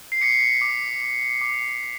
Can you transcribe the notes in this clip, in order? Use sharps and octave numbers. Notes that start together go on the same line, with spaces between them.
C7
D6 B6 C#7
D6
D6
D6